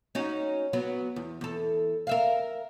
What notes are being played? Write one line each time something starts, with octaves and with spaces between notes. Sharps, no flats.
C#4 D#4 F#4
F#3 B3
E2
E2 A4
A#4 E5 F5